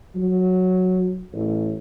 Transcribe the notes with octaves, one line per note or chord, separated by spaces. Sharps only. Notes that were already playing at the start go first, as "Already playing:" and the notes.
F#3
A1